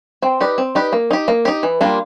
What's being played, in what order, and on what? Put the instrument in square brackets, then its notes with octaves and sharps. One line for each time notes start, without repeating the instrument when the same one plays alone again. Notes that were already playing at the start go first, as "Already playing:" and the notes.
[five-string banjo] C4
D#4 G4 B4 D5
C4
D#4 G4 B4 D5
A#3
D#4 G4
A#3
D#4 G4
E3
G3 A#3 D4 F4